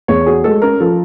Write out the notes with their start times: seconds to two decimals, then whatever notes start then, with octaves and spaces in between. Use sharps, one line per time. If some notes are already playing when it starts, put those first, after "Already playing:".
0.08 E2 C#5
0.26 F#4 G#4
0.44 G#3 A4
0.62 C#4 A#4
0.80 F3 A4